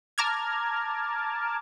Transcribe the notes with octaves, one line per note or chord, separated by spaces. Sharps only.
A5 A#5 D6 F6 G#6